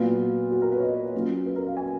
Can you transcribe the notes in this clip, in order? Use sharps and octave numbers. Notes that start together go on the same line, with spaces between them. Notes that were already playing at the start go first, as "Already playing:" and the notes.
Already playing: A#2 F#3 B3 F4
F#4
A#4
B4
C#5
D#5
F#3 A#3 C#4 F4
B4
A#4
F5
G#5